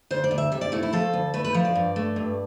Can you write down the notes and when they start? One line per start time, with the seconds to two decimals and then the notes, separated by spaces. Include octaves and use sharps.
0.11 D2 C5
0.24 D5
0.31 D2
0.38 E5
0.52 C3 E5
0.61 D5
0.72 A3 E4
0.83 E4
0.93 F3 A4
1.13 D2
1.34 A3 B4
1.45 B4
1.54 F3
1.65 D5
1.75 G2
1.96 A3
2.16 G2